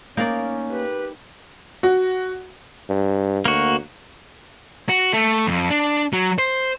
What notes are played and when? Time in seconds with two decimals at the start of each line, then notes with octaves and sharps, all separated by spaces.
0.17 A#3 C#4 D#4 A#4 D5
0.70 C4 G4 B4
1.83 F#4
2.90 G2
3.45 D2 A#3 F#4
4.89 F#4
5.13 A3
5.47 F2
5.70 D4
6.13 F#3
6.39 C5